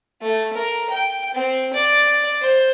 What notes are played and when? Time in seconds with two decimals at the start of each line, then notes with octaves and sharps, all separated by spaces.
0.21 A3
0.53 A#4
0.90 G5
1.35 C4
1.73 D5
2.42 C5